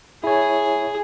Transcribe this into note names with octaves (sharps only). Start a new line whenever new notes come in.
E4 G#4 C#5